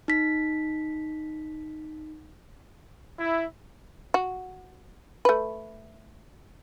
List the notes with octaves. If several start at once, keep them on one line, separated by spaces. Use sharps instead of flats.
D#4 B6
E4
F#4
A3 B4